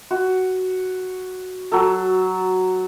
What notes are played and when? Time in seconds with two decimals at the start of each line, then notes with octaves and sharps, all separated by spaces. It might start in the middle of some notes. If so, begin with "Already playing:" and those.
0.11 F#4
1.72 F#3 A4